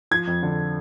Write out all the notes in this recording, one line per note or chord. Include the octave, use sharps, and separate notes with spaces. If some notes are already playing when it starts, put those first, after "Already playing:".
F3 G#6
F2
D3